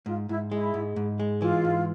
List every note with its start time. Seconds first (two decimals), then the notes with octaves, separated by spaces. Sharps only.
0.06 G#2 F4
0.29 G#2 E4
0.51 G#3 E4
0.74 G#2
0.96 G#2
1.19 G#3
1.42 E3 F4
1.65 G#2